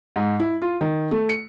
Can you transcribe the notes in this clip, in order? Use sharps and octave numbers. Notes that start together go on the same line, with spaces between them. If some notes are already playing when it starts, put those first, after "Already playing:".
G#2
E4
F4
D#3
A3
C#7